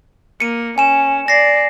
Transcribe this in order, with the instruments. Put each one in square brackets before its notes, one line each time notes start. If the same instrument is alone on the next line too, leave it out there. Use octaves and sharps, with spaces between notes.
[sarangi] A#3 [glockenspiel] C#7 D#7
[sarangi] C#4 [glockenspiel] G#5 E7
[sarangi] D5 [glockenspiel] A#6 C7